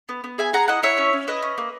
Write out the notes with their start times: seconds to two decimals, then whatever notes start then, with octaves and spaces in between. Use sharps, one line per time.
0.09 B3
0.24 B3
0.38 G#4 E5 G#5
0.53 G#4 F#5 A#5
0.68 E4 D#5 F#5
0.83 E4 C#5 E5
0.97 C#4
1.13 C#4
1.27 E4 B4 D#5
1.42 C#4
1.58 A#3